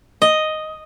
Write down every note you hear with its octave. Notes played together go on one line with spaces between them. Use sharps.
D#5